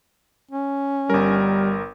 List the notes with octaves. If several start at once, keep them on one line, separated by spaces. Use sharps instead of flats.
C#4
G1 G3 A#4